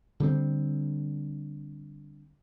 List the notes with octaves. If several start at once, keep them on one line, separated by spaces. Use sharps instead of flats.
D3 G3 C4